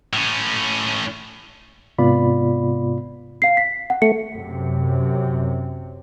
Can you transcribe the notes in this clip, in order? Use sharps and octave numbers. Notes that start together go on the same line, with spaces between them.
A2 C#4
G#2 C3 B3 F4 D5 B5
F5 C7
B6
F#5
A3 C#7
F#2 C3